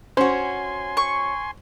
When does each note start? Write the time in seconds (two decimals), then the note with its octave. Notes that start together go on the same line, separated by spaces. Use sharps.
0.17 C#4 F#4 C5 G#5 C6
0.97 C#6